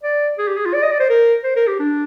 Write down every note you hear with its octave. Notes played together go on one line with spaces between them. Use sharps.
D5
G#4
G4
G#4
F4
D5
D#5
D5
C5
A#4
C5
A#4
G4
D4